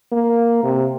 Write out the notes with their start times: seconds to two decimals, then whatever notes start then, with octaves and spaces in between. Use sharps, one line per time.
0.12 A#3
0.64 C3